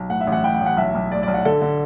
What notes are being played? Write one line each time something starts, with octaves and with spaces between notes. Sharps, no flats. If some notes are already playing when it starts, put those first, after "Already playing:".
Already playing: B1
A2 F#5
E5
A1
F#5
A1 G5
G5
A1
F#5
B1 E5
B1
A2 D5
B1 D5
F#5
D3 A4
D3